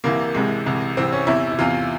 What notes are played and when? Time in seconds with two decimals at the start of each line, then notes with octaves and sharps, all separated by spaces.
0.04 C2 C3 E3 A#3
0.34 C2 C3 E3 G#3
0.66 C2 C3 E3
0.97 C2 C3 E3 C4
1.12 C#4
1.27 E2 C3 E3 E4
1.52 E4
1.58 E2 C3 E3 F4